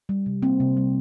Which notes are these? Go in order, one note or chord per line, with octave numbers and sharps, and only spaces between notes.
G3
C3
A#3 C4
C3
G3